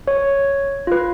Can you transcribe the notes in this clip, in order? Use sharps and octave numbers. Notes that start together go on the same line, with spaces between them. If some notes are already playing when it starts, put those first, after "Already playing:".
C#5
F4 B4